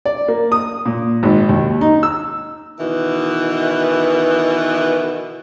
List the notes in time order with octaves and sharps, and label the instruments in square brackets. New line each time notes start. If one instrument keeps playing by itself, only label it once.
[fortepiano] D5
A#3
D#6
A#2
G#1
D#2
D#4
E6
[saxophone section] B2 D#3 E3